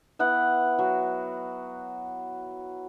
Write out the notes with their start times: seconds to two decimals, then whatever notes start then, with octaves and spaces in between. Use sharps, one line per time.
0.19 B3 E4 F#5
0.79 F#3